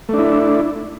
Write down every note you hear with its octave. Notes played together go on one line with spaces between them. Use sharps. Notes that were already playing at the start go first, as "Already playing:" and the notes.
A3 D4 E4